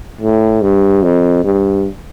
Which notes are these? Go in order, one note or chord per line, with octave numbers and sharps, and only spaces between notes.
A2
G2
F2
G2